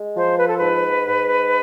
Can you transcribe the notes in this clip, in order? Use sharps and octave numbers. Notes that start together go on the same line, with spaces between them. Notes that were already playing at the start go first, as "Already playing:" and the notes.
Already playing: G#3
F3 C5
B4
A4
G#2 B4
G#2